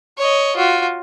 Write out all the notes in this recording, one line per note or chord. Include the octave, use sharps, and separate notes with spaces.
C#5 D#5
F4 F#4